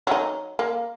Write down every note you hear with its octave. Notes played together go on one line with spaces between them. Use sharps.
F#3 D#4
A#3